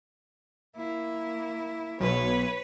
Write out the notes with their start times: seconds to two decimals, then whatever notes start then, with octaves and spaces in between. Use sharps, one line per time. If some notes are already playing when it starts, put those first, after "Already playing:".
0.76 A#3 E4
2.00 B1 B4 C#5